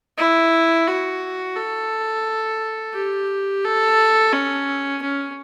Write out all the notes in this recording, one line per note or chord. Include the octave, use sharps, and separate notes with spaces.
E4
F#4
A4
G4
A4
C#4
C#4